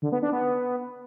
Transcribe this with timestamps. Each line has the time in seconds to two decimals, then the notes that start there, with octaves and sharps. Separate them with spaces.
0.02 D3
0.12 B3
0.22 D4
0.32 B3